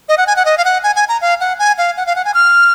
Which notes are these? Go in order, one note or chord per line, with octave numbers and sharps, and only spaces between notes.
D#5
F#5
G#5
F#5
D#5
F5
F#5
G#5
G#5
A#5
F5
F#5
G#5
F5
F#5
F5
F#5
G#5
F6